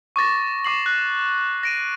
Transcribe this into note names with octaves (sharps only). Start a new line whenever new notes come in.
C#6 D6 A6 A#6
C#6 D6 C7 F#7
F#6
A#6 D7 D#7